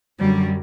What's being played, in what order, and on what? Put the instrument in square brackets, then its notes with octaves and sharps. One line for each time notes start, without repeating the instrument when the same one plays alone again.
[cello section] F#2 D3 F#3 G3